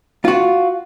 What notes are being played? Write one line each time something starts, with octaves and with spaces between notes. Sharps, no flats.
F4 F#4